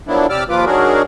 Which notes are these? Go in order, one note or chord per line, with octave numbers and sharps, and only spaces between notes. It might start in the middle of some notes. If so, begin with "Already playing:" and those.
F3 F#3 A#3 B3 D4 E4
C3 G4 D5 D6 E6 F6
D#2 F3 A#3 F4 B4 D6
D#3 F#3 D4 F#4 G#4 A#4